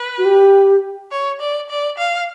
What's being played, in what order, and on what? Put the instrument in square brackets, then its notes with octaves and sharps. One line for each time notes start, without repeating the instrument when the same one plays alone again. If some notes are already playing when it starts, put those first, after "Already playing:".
Already playing: [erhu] B4
[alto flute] F#4
G4
[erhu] C#5
D5
D5
F5